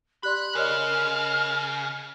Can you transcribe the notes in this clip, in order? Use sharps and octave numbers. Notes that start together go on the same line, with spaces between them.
G4 D5 B5 C6 F#6
C#3 A#4 C#5 D#5 F6